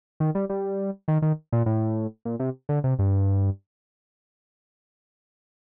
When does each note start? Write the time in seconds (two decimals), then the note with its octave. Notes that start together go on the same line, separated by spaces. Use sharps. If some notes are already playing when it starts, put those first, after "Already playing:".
0.20 D#3
0.35 G3
0.49 G3
1.08 D#3
1.22 D#3
1.52 A#2
1.66 A2
2.25 A#2
2.39 C3
2.69 D3
2.84 C3
2.99 G2